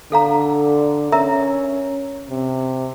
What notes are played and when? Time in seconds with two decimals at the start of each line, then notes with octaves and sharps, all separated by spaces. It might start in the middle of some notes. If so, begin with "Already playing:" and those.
0.12 D3 A4 F5 A#5
1.12 C#4 A#4 E5 A#5
2.30 C3